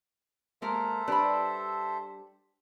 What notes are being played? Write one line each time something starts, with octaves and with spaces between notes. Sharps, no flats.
G#3 A#3 A4 A#4 C5 E5
G3 D4 B4 B5